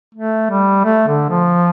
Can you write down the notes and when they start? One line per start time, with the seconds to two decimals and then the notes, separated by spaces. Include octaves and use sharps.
0.15 A3
0.50 G3
0.84 A3
1.08 D3
1.30 F3